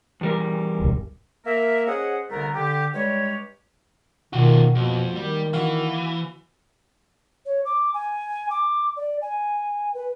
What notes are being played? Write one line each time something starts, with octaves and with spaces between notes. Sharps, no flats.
E2 G3 A#4
D1 B1 G2
A#3 A#4 E5
C#4 G#4 C5 D#5 F#5
C2 D3 G3 A3 B3 A#4
D3 G4
G2 G3 G#3 G4 C#5
D#2 B2 D#3 F4 F#4
F2 B2 A#3 D7 D#7
D#3 G3
E3 F#4 F5
C#5
D6
G#5
D6
D5
G#5
B4